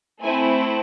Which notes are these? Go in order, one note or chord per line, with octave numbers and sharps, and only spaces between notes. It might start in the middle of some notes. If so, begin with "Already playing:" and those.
A3 C4 E4 G#5